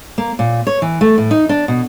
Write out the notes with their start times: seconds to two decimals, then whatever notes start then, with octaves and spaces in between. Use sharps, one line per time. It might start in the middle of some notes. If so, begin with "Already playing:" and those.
0.18 A#3
0.39 A#2
0.67 C#5
0.82 E3
1.01 A3
1.18 A2
1.31 D#4
1.49 D4
1.68 B2